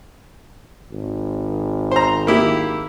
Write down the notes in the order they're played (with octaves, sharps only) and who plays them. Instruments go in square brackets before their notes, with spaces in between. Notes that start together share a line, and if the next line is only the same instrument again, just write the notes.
[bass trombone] G#1
[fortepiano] C5 A#5
A#3 E4 G4